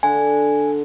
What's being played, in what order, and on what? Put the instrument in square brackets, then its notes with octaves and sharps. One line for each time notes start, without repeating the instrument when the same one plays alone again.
[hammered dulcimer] D3 [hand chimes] G#5